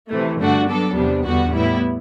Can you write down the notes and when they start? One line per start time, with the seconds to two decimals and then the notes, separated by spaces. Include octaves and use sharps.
0.10 C3 E3 A3
0.39 G2 D3 A3 D4 F#4
0.68 F#3 B3 D4 A4
0.95 E2 C3 G3 B3 D4
1.24 E2 D3 G3 B3 F#4
1.52 A2 G3 B3 E4